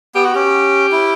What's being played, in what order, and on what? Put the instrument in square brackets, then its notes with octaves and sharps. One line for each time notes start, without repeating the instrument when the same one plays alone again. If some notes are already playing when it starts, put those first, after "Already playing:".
[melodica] B3 [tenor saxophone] G4
[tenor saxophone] F#4
[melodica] C#4 [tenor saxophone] G4
[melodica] E4